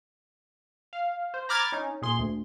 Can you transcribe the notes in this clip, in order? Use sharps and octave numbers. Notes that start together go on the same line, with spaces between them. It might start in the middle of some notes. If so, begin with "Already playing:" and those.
F5
C5
A#5 B5 D6 F6 G#6 A6
C#4 D#4
A#2 G#4 C6
D2